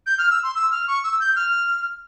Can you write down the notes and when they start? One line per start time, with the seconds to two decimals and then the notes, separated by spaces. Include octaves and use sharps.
0.07 G6
0.18 F6
0.31 E6
0.43 C6
0.55 E6
0.71 F6
0.88 C#6
1.04 E6
1.20 G6
1.36 F6